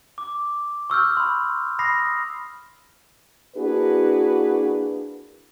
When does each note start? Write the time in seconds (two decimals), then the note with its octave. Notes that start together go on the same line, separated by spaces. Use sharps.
0.18 D6
0.90 C#6 E6 F6 G6
1.17 B5 C6
1.79 B5 D#6 A#6 C7
3.56 A#3 D4 E4 F#4 G#4 B4